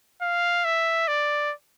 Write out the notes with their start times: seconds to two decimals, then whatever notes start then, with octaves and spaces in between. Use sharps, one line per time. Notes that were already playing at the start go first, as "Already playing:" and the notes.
0.22 F5
0.65 E5
1.08 D5